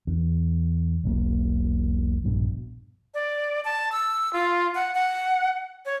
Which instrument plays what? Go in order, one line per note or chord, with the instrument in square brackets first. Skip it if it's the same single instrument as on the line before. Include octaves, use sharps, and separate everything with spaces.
[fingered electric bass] E2
E1 B1 A#3
D#1 A#1 G2 B2
[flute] D5
A5
E6
F4
F#5
F#5
C#5